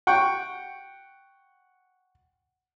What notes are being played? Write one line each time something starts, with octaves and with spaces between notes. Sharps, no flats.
F#5 G5 C#6